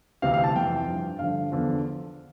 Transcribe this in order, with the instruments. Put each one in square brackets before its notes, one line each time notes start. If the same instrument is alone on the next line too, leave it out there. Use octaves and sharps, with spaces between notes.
[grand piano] D2 C3 E3 F5
F5
A5
F2 E3 G5
G2 F3
G2 D3 F3 F5
E2 D3 F3